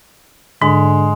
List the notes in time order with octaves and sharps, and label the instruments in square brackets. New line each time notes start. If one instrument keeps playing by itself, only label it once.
[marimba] G#2 [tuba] D3 [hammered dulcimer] G#3